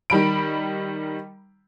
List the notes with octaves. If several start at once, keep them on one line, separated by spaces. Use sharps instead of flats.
D#3 G3 B5 D7